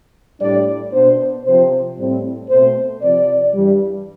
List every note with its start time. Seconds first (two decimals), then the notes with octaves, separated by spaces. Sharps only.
0.40 A2 G3 D4 D5
0.92 B2 B3 D4 C5
1.44 C3 F3 C4 C5
1.97 A2 G3 C4
2.49 B2 A3 C4 C5
3.01 C3 F3 C4 D5
3.53 G2 E3 G3